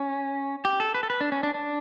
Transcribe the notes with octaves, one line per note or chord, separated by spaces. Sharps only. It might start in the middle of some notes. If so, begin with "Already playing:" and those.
Already playing: C#4
G4
A4
B4
A4
B4
D4
C#4
D4
D4